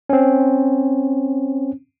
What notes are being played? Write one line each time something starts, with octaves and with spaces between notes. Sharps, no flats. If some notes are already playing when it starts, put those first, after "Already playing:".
C4 C#4